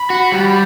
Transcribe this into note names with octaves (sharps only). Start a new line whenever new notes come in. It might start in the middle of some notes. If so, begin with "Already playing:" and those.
Already playing: B5
F#4
G3